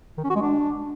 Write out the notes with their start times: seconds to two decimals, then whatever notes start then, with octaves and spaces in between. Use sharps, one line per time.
0.18 D#3
0.24 C#4
0.30 F#4
0.36 G#3
0.42 D4